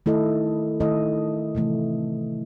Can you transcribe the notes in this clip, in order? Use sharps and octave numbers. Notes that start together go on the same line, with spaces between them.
D#3 A3 E4 A4 D#5
D#3 A3 E4 A4 D#5
C3 E3 A3